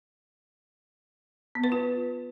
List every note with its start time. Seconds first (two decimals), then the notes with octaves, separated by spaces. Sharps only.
1.55 B3
1.64 B4
1.72 F4